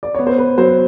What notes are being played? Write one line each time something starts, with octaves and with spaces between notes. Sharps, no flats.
D5
B3 C#5
C5
B4
F#3 C5